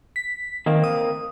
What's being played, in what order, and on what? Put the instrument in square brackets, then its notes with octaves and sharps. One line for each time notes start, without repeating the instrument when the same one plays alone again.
[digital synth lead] B6
[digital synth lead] D#3 [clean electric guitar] A#3 C4
[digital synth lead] D#6